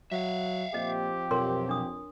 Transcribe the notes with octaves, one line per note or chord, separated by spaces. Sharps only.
F#3 E5 F5
A#2 F3 C4 G4 D#5
B1 F2 A#4 C#5 C6
D4 D#6